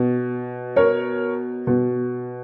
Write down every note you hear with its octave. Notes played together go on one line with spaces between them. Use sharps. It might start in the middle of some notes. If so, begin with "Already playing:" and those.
Already playing: B2
A#4 C#5
B2